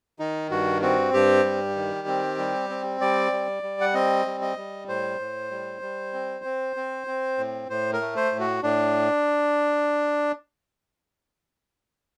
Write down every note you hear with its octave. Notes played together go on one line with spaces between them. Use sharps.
D#3 D#4
G2 F#4
C4 F#4
G2 G4
G3
D#3
C4
G3
C4
G3 D5
G3
G3
F#5
C4 D#5
G3
D#5
G3
A2 C5
A2
G3
G3
C4
C4
C4
C4
A2
A2 C5
A#4
A3
C5
A2
F#4
A2 D4